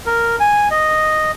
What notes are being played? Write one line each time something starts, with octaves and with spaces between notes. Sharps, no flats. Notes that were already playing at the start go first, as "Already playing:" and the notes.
A#4
G#5
D#5